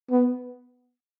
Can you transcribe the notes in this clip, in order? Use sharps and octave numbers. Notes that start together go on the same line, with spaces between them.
B3